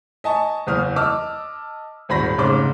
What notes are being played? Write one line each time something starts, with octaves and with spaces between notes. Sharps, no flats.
D#5 G#5 A5 C#6
F#1 E2 D#6 F6
D#5 A5 D6 E6 F6
D#1 G#1 B5 A#6
F1 G#2 C#3 C6 D6